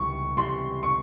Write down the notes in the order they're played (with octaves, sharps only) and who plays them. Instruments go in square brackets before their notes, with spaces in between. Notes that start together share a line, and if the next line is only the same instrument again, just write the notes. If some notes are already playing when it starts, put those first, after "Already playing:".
Already playing: [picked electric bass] C#2 C3 E3 G3 [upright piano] C#6
[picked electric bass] C#2 C3 E3 G3 [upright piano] C6
[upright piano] C#6